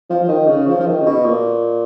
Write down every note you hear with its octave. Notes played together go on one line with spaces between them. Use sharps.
F3
F3
D#3
C#3
F3
F3
D#3
C#3
B2
A#2